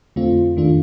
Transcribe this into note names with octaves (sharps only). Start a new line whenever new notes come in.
F2 D3 A3 C4 F4
F2 D#3 A3 D4 F4